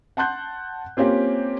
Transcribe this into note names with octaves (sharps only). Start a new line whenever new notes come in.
F#5 A5 C6 F#6 G6
A#3 C4 C#4 F4 G4